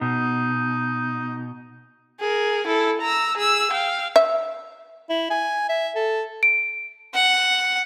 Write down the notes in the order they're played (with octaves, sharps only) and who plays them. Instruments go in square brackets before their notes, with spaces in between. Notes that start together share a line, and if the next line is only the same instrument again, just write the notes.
[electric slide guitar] B2 [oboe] D#4
[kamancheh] G#4 A#4
E4 A4
A#5 E6
G#4 E6
F5 G5
[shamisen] E5
[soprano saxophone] E4
G#5
E5
A4
[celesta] D7
[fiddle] F#5